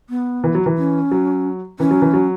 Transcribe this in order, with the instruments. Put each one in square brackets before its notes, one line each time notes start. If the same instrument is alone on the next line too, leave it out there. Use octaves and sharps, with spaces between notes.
[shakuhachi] B3
[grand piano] E3
F#3
E3
[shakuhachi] C#4
[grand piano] F#3
[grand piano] E3 [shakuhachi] C#4
[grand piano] F#3
E3
F#3